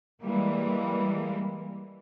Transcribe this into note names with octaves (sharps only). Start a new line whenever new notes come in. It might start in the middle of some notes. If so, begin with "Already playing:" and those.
E3 G3 G#3 A#3